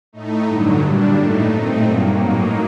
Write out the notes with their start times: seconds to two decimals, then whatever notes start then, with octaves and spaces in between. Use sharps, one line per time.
0.13 A2 A3 D#4
0.47 G2 D3 F#3
0.81 A#2 G3 D4
1.16 A2 A3 D#4
1.50 A#2 A3 C4 D#4
1.84 G2 F#3 A#3
2.19 A2 F#3 A#3 D#4